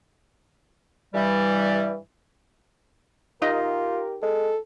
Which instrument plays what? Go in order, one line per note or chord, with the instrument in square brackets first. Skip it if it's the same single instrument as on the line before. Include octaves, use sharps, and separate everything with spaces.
[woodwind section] G2 E3 G3
[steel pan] D#4 D#5 [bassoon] F4 [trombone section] G4 A#4
[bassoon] G#3 [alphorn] A4